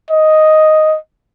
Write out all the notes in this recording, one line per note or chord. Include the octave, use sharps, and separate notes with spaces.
D#5